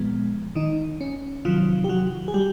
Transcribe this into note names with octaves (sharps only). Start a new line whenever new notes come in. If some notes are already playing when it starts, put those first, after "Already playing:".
Already playing: A#2 F3 G#3 B3
D#3 D#4
C#4
C3 D#3 F3 F#3 F4
G4
F#3 F#4
G#4
G3 G4